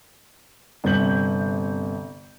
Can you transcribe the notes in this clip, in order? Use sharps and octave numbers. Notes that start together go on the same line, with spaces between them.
G1 C3 G6 F#7